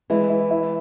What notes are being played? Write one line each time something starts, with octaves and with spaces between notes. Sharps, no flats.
E3 G#3 E4
E4
E4